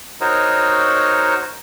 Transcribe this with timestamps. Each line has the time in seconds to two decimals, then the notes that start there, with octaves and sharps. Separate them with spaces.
0.21 D#4 F#4 A#4 C5 C#5 D#5